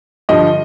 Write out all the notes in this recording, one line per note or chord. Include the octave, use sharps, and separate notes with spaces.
G2 D3 F3 D#5